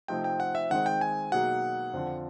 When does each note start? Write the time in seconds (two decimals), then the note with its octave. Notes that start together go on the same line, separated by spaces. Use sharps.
0.08 C3 F3 A3 C4 D#4 G5
0.24 G5
0.40 F#5
0.55 E5
0.71 D#3 G#3 C4 D#4 F#5
0.86 G5
1.01 G#5
1.32 B2 F#3 A#3 D#4 G#4 F#5
1.93 F2 D3 F3